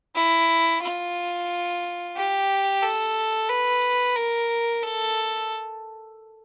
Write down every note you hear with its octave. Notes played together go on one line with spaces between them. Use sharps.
E4
F4
G4
A4
B4
A#4
A4